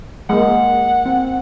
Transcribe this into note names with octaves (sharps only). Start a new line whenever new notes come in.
G#3 A#3 F#5
C4